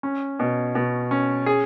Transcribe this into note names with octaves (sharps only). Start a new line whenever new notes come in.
C#4
B2
B2
C#4
G#4